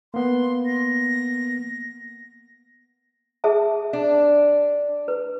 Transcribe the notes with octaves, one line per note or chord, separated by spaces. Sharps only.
A#3 B3 C6
A#6
G#4 E5 A5
D4
B4